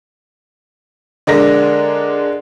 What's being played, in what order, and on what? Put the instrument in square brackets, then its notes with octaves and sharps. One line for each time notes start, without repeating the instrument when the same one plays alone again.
[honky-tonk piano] D3 G#3 D4 A#4 A#6